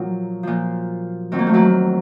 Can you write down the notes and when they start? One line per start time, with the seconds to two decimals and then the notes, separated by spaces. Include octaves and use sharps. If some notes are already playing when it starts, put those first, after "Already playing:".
Already playing: A#2 F3 F#3
0.43 A#2 F3
1.32 F2 D#3 F#3 C4
1.39 A#3
1.47 A3
1.53 F#3 A#3